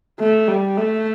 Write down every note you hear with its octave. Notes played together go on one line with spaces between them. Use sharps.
A3
G3
A3